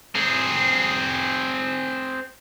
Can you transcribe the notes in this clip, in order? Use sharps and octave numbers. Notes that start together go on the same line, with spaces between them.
C4 G#4